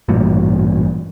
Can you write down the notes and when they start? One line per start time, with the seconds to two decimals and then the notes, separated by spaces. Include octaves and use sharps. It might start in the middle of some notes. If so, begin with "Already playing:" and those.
0.08 A1 G2 A#2